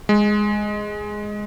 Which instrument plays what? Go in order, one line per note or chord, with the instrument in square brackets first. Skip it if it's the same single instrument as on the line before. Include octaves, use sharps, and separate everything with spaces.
[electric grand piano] G#3